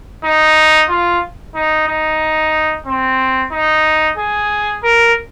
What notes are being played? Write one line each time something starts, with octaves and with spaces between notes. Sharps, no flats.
D#4
F4
D#4
D#4
C4
D#4
G#4
A#4